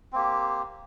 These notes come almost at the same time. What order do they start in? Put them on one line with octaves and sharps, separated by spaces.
C4 A#3 G4